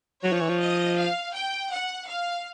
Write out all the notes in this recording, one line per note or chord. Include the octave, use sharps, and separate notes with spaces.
F#3 C#5
F3
E3
F3
D#5
F5
G5
F#5
F5